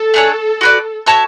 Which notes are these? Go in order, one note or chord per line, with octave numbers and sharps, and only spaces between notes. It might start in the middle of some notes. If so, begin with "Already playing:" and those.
Already playing: A4
A3 D4 G#4 C#5
F#4 B4 D5
F#4 C#5 E5 A5